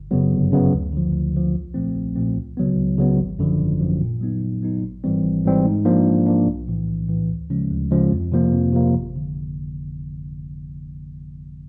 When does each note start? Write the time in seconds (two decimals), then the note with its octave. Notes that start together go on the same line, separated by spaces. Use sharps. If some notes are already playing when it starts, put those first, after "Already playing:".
Already playing: G1
0.11 F#2 C#3 F#3 B3
0.32 G1
0.52 F#2 C#3 F#3 B3
0.73 D2
0.93 D3 F3
1.13 D2
1.34 D3 F3
1.55 B1
1.74 A#2 F3 A3 C4
1.96 B1
2.15 A#2 F3 A3 C4
2.36 C#2
2.57 C#3 F#3 B3
2.78 C#2
2.98 C#3 F#3 B3
3.19 G#1
3.39 F#2 D3 F3
3.59 G#1
3.80 F#2 D3 F3
4.01 A#2
4.21 F#3 B3 D#4
4.42 A#2
4.62 F#3 B3 D#4
4.83 G#1
5.04 G#2 E3 G3 C4
5.24 G#1
5.45 G#2 E3 G3 C4
5.65 G#2
5.85 F3 A#3 D4
6.06 G#2
6.26 F3 A#3 D4
6.47 B1
6.68 A2 E3
6.88 B1
7.08 A2 E3
7.30 D2
7.50 C#3 F3 G#3 C#4
7.70 D2
7.91 C#3 F3 G#3 C#4
8.11 F2
8.32 C3 F3 A#3
8.53 F2
8.73 C3 F3 A#3
8.94 G#1
9.16 D3